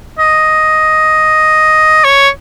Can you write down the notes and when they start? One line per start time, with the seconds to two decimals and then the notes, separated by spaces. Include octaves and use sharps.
0.19 D#5
2.04 C#5